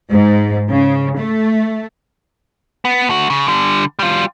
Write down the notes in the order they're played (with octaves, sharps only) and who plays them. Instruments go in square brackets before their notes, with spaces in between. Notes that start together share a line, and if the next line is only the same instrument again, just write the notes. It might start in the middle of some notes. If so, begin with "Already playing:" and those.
[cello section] G#2
C#3
A3
[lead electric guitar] B3
A3 F#4
C#3
D3 G3
G3 F4